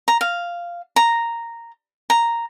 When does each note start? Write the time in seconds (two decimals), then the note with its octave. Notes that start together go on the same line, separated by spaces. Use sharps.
0.08 A#5
0.21 F5
0.96 A#5
2.10 A#5